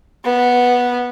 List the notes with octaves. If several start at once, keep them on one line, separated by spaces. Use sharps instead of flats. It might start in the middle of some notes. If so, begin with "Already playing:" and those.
B3